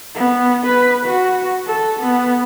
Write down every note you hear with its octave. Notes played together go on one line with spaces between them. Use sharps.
B3
B4
F#4
A4
B3